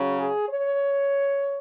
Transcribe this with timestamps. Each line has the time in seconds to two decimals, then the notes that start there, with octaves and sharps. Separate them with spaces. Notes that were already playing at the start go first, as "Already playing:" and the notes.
Already playing: C#3 F#3 C#4
0.18 G#4
0.48 C#5